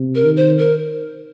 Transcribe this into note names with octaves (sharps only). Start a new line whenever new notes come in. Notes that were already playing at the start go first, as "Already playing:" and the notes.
Already playing: C3
A#4
D#3
C5
A#4